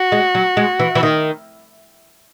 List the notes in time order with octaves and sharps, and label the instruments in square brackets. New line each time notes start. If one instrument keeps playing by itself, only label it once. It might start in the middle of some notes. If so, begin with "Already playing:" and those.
Already playing: [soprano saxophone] F#4
[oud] G#3
F#3
G#3
E3
E3
D#3